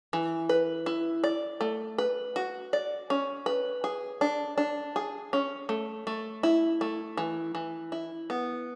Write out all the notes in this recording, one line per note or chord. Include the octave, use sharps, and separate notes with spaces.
E3
B4
E4
D5
A3
B4
F#4
D5
C#4
B4
G#4
D4
D4
G#4
C#4
A3
A3
E4
A3
E3
E3
E4
B3